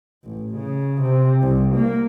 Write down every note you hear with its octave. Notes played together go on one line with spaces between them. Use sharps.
A1
C#3
C3
C2
A#3